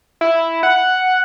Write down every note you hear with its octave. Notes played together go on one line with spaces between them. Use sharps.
E4
F#5